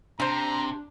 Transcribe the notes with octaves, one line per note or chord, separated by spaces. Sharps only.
C3 G3 D4 C5 A#5